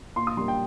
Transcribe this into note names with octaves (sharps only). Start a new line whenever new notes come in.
A#2 C6
D#6
G3 A#3 C6
G5